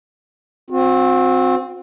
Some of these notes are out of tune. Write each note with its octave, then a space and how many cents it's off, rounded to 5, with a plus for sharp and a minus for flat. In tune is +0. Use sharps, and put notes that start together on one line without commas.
C4 +0 F#4 -40